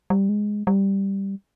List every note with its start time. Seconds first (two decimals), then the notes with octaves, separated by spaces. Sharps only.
0.10 G3
0.29 G#3
0.67 G3